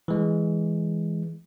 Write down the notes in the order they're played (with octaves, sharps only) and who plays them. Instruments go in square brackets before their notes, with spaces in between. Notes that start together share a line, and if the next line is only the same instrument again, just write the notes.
[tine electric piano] E3 G#3